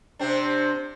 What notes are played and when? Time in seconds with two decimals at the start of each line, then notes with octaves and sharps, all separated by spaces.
0.19 C3 C4 D4